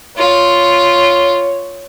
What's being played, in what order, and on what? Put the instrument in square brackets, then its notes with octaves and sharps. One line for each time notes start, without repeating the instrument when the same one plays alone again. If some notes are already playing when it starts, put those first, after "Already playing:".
[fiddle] F4 [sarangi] C#5